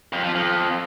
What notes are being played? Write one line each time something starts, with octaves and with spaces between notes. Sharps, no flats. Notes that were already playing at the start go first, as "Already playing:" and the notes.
F2
F3
F2